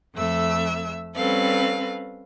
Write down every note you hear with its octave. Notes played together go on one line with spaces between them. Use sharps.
F2 A3 E5 E6
G3 C4 C#4 A4 B4 F5